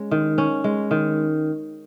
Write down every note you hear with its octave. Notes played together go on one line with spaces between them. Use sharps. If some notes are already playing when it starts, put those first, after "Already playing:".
Already playing: G#3 C#4
D#3
C#4
G#3
D#3